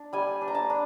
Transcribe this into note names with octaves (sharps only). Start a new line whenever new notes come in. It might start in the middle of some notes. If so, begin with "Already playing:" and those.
Already playing: D4
G3 G#5
D4
A#5
A5
D4